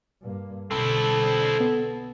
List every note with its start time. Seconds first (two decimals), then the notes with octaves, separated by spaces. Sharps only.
0.22 G2 A#3
0.71 B1 D3 C4 E4 A4
1.60 B3